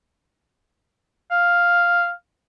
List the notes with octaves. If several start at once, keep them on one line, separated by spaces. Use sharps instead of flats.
F5